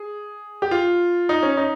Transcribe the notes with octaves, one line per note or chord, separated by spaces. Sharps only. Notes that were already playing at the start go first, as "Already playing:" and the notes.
Already playing: G#4
G4
F4
D#4
C#4
D#4